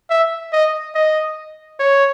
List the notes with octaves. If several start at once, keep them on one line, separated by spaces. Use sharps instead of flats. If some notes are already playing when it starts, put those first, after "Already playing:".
E5
D#5
D#5
C#5